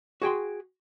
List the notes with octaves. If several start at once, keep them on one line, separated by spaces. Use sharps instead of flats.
F#4 G#4 G5 C6